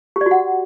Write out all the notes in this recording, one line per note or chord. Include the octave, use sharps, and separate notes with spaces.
G4
D5
F#4
F#5